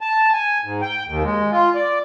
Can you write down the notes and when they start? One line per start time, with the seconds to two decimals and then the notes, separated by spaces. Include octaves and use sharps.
0.01 A5
0.33 G#5
0.64 G#2
0.81 G5
1.08 D#2
1.24 G#3
1.52 F4
1.75 D5